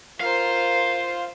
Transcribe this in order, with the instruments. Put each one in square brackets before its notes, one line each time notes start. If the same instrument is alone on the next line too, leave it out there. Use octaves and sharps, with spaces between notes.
[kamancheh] F4 C5 [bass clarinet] A#4 [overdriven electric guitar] F5